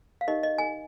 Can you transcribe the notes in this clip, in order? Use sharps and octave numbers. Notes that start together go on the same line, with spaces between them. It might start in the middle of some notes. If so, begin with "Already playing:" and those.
F5
D#4 G4 A#4 D#5
D#5
G#5